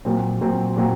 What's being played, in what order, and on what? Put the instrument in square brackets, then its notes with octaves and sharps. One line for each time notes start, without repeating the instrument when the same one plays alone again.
[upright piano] A#2 F#3 C4
A#2 F#3 C4
A#2 F#3 C4